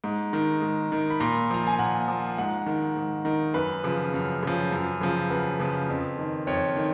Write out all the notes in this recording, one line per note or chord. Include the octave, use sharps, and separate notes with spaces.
G#2
D#3
G#2
D#3
B5
A#2 A#5
F3 A#5
G#5
A#2 F#5
F3
G#2 F#5
D#3
G#2
D#3
F#2 B4
C#3 F3
F#2
C#3 F3
F#2
C#3 F3
F#2 B4
C#3 F3
F2
D#3
F2 C#5
D#3